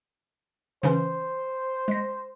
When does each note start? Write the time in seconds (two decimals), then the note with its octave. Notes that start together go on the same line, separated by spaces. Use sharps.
0.83 C#3 E3 C#4 C5
1.88 G#3 A#6